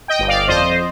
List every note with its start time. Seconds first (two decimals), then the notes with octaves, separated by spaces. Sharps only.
0.08 D#5 G5
0.19 G1
0.28 D5 F5
0.48 F2 C5 D#5